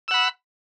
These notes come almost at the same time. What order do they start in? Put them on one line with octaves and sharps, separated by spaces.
E6 F#5 B5